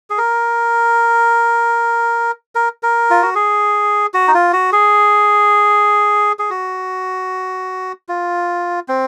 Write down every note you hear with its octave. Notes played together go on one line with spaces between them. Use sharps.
G#4
A#4
A#4
A#4
F4
F#4
G#4
F#4
D#4
F4
F#4
G#4
G#4
F#4
F4
C4